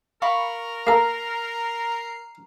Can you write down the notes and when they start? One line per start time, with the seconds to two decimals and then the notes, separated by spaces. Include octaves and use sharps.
0.22 A#4 F5 B5 C#6
0.87 A#3 A4 A#5 F6 C7